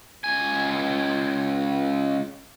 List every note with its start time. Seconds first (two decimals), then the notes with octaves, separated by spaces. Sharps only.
0.24 C#2 G#5